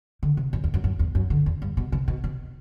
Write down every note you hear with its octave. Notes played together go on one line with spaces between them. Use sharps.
D3
C3
F#2
E2
F#2
F#2
E2
F#2
D3
E2
G2
B2
C3
B2
B2